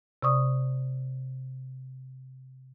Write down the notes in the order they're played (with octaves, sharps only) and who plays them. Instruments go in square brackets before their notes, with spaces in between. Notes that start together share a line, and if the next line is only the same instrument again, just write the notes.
[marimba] C3 D5 C#6 D#6